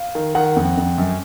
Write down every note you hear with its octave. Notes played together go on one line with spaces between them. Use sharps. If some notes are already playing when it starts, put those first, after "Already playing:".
Already playing: F5
D#3
D#3 F#5
F2
F2
F#2